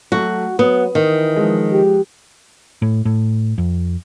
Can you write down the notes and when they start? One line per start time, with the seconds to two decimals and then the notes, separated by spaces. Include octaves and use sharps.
0.12 F#3 A3 F#4
0.59 F#3 B3 D#6
0.95 D#3 E3
1.36 F3 G#3
1.72 G4
2.82 A2
3.05 A2
3.58 F2